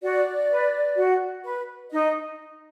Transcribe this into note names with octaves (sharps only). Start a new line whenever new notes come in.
F#4 D5
B4
F#4
B4
D#4 D#5